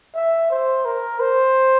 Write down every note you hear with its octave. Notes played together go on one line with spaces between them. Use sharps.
E5
C5
A#4
C5